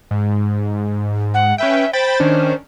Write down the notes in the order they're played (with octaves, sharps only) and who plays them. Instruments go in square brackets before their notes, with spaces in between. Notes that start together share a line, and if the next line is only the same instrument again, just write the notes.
[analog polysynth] G#2
[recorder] F#5
[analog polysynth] C#4 B4 G5 [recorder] E5
[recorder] C5 [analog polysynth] G5 B5 A6
[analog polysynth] D#3 C#4 D4